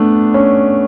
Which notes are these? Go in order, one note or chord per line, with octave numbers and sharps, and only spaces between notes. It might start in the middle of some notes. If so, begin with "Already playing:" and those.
Already playing: A3 B3 D4
C#4